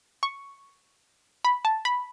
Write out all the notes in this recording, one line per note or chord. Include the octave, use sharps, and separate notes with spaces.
C#6
B5
A5
B5